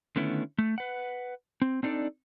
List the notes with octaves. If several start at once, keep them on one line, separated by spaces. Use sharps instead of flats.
D3 D#3 A3 B3 C#4 E4
A3
B4 F#5
C4
C4 D4 D#4 A4 D5